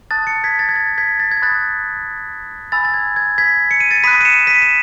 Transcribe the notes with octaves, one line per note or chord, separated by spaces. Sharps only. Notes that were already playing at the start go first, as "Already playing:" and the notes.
A5 D#6 F#6 A6
A6 C#7
G#6 B6
A6
G#6
A6
G#6 B6
A6
G#6
B5 D#6 F#6 A6
G#5 B5 E6 A6
A6
G#6
G#6
G#6 B6
C#7
D#7
A6 C#7
B5 D#6 F#6 B6 D#7
D#7
C#7 E7
B6 D#7
E7